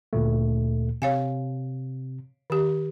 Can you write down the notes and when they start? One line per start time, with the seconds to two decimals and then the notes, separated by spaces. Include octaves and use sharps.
0.13 D2 A#2 A3
1.02 C3 C#5 F5 G#5
2.50 D#3 G4